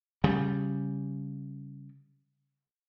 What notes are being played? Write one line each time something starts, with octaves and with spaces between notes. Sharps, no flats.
C#3 G3